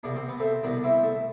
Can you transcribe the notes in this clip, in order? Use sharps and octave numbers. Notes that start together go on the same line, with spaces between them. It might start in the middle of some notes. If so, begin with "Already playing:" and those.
C2 B2 D4
C4
B3
A3 C4
C2 B2 B3 D4
C4 E4
A3